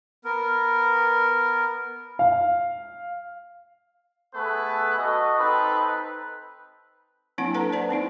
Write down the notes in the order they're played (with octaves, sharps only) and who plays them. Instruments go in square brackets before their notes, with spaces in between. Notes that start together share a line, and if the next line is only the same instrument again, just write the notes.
[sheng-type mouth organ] B3 A#4
[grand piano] F5
[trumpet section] A3 B3 G#4 A4 B4
F#4 A4 D#5
C4 D#4 A4 B4
[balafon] F#3 A#3 C4 D4 E4 F#5
D4 A4 B4 F#5 A5 A#5
C5 D5 A5
B3 C4 D#4 E4